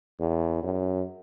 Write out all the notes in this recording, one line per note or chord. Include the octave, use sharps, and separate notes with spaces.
E2
F#2